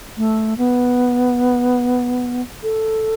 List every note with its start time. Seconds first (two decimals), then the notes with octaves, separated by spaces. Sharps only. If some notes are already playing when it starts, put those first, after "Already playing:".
0.17 A3
0.58 B3
2.63 A4